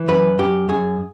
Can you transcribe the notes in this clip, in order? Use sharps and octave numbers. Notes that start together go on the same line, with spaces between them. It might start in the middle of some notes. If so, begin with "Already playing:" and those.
Already playing: E3
F#2 B4
F#2 G4
F#2 G#4